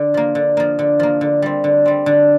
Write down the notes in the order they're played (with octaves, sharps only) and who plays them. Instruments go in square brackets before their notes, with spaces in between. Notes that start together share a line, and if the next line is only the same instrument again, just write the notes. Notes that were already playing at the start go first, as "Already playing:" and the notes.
Already playing: [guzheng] D3
F3 A#3
D3
F3 A#3
D3
F3 A#3
D3
G3 C4
D3
G3 C4
D3